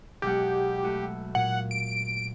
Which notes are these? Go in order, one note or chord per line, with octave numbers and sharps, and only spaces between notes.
B1 G#3 G4 F#5
A3 F#4
A#2 F#5
D7